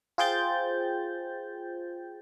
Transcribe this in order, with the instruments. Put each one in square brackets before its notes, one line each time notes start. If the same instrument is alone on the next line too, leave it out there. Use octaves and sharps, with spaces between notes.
[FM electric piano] F4 G#4 C5 G5 G6 A6